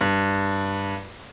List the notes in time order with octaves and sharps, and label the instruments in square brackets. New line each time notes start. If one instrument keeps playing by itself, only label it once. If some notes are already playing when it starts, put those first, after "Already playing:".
[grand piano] G2